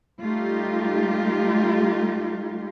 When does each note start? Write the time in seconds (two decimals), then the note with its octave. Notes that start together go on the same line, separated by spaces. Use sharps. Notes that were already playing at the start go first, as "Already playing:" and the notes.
0.23 G3 A3 D#4 F4 G4